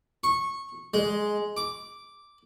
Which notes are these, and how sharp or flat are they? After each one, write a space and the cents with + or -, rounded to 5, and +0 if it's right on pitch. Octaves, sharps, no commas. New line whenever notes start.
C#6 -15
G#3 +5
D6 -5